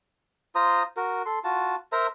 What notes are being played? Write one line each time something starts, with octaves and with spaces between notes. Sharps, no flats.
F4 C5 A#5 D#6
F#4 A#4
A4 C6
F4 F#4 A5
A#4 C5 E5 A#5